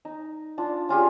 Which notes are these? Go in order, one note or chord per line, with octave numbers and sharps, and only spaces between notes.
D#4
D4 F4
C#4 F4 G4 G#4